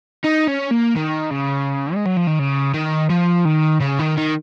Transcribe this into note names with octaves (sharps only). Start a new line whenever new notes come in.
D#4
C#4
A#3
D#3
C#3
G#3
F#3
F3
D#3
C#3
D#3
F3
D#3
C#3
D#3
D#3